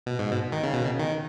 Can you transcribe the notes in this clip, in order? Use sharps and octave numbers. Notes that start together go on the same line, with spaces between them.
B2
G#2
B2
D#3
C#3
B2
C#3
D#3